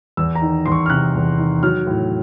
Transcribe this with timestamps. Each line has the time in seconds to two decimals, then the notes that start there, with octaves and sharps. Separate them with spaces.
0.17 E2 E6
0.35 A#5
0.42 D#3
0.66 E2 C6
0.72 C#6
0.86 F6
0.90 C3 F#6
1.15 E2
1.39 D#3
1.63 F#3 F6
1.87 A2